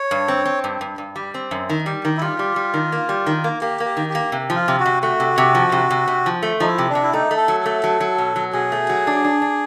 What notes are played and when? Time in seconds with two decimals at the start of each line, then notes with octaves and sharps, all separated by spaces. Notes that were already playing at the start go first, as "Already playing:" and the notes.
Already playing: C#5
0.11 G2
0.28 C4
0.46 C4
0.64 G2
0.81 G2
0.98 G2
1.16 G3
1.34 C4
1.51 F#2
1.70 D#3
1.86 G3
2.05 D#3
2.17 E4
2.22 G3 F4
2.39 G3
2.56 G3
2.74 D#3
2.92 A#3
3.09 G3
3.27 D#3
3.44 A#3
3.61 A#3 G4
3.80 A#3 G4
3.97 D#3
4.10 G4
4.15 A#3
4.32 C3
4.50 F3
4.55 F4
4.68 C3
4.80 F#4
4.86 C3
5.03 A3 F#4
5.20 C3
5.38 C3
5.55 F3
5.72 C3
5.90 C3
6.08 C3
6.26 F3
6.43 A3
6.60 F3 D#4
6.67 E4
6.78 C3
6.89 D4
6.95 C3
7.03 E4
7.13 A3 D#4
7.31 A3
7.37 A4
7.48 F#3
7.60 A4
7.66 A3
7.84 F#3
8.00 F#3
8.18 B2
8.36 F#3
8.53 B2 G#4
8.72 A3
8.89 F#3
9.07 D4
9.24 D4
9.42 D4